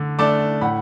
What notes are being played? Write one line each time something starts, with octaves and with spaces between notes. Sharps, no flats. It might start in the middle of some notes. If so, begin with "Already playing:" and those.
Already playing: D3 A3
A3 D4 A5 D6
A2 F#5 B5